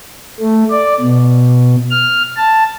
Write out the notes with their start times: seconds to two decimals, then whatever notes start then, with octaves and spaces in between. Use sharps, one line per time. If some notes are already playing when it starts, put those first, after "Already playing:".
0.40 A3
0.70 D5
1.00 B2
1.91 F6
2.37 A5